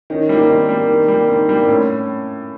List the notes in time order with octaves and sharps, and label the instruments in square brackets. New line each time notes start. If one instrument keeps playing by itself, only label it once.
[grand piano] D#3 [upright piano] C#4 D#4
[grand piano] G3 A#3 [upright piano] D4 E4
[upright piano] D#4
[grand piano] D#3 [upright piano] C4 D4
[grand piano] G3 A#3
D#3
G3 A#3
[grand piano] D#3 [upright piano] C4 D4
[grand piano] G3 A#3
[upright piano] C4
[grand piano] A2 [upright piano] C#4